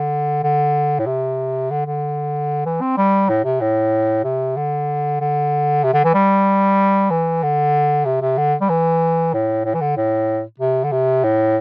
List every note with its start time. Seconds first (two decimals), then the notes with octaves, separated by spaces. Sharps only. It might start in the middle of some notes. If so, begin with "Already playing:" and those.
Already playing: D3
0.43 D3
0.99 A2
1.06 C3
1.71 D3
1.86 D3
2.66 E3
2.81 C4
2.97 G3
3.29 A2
3.45 C3
3.61 A2
4.24 C3
4.57 D3
5.20 D3
5.84 C3
5.94 D3
6.04 E3
6.14 G3
7.10 E3
7.43 D3
8.06 C3
8.22 C3
8.38 D3
8.61 G3
8.69 E3
9.34 A2
9.65 A2
9.74 E3
9.81 D3
9.97 A2
10.59 C3
10.84 D3
10.92 C3
11.24 A2